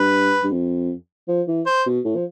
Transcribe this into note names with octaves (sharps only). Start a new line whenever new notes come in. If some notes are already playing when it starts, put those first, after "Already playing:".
Already playing: G2 B4
G2
F2
F3
E3
C5
B2
A2
F3